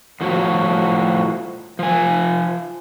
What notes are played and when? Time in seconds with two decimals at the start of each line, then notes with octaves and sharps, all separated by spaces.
0.21 A2 F3 F#3 F#4
1.79 F3 G#5